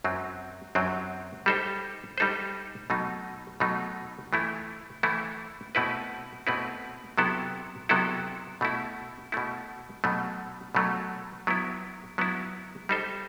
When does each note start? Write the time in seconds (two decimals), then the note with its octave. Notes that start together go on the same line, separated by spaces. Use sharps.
0.04 F#2 F#3 C4
0.75 F#2 F#3 C4
1.46 G3 D#4 A4 C5
2.18 G3 D#4 A4 C5
2.90 B2 F#3 A3 D#4
3.60 B2 F#3 A3 D#4
4.33 E3 A3 E4
5.03 E3 A3 E4
5.75 B2 A3 C4 E4 B4
6.47 B2 A3 C4 E4 B4
7.18 C3 F#3 B3 E4 A4
7.89 C3 F#3 B3 E4 A4
8.61 B2 A3 E4
9.32 B2 A3 E4
10.04 B2 F#3 A3
10.75 B2 F#3 A3
11.47 F#3 B3 E4
12.18 F#3 B3 E4
12.89 G3 D#4 A4 C5